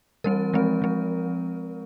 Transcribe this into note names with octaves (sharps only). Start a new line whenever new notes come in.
E3 G3 C4 A#4
F3 G#3 C4
F3 G#3 C4